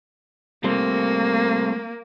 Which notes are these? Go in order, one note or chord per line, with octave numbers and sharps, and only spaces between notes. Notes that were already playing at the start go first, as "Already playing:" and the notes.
G3 A3 A#3 C4